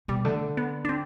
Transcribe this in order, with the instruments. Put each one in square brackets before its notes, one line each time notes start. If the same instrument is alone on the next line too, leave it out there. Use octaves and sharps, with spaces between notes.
[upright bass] B2 [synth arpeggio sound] G3
[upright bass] D3 [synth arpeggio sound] A3
[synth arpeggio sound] B3
D4
C4